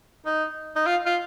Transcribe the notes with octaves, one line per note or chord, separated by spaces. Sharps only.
D#4
D#4
F4
F4